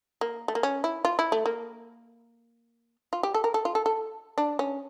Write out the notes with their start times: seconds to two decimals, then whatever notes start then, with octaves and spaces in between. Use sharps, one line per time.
0.21 A#3
0.48 A3
0.55 A#3
0.63 C#4
0.84 E4
1.05 F4
1.19 E4
1.32 A3
1.46 A#3
3.13 F4
3.23 G4
3.34 A4
3.44 A#4
3.54 A4
3.65 F4
3.75 A4
3.86 A4
4.38 D4
4.59 C#4